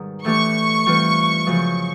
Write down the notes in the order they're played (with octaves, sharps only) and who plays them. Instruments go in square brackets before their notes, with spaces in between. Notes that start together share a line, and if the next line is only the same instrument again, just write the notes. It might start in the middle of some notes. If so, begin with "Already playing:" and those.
Already playing: [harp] G#2 B2 D#3 G3
[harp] A2 E3 A3 D4 G4 [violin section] C#6
[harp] E3 G3 C4 F4
F#2 C#3 F3 G#3